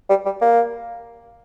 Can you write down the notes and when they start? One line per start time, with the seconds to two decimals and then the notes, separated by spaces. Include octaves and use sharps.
0.10 G3
0.25 G3
0.41 A#3